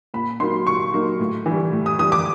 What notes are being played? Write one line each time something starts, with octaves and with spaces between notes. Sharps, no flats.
A#2 B5
F#3 A#3 D#4 C6
A#2 C#6
F#3 A#3 D#4
A2
E3 G3
A2
D#6
E3 G3 D#6
D6